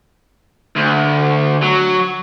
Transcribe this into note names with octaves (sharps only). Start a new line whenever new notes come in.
D2
F#3